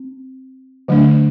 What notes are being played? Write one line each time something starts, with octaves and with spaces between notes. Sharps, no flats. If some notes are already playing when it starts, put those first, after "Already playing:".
Already playing: C4
D3 F#3 A3 D4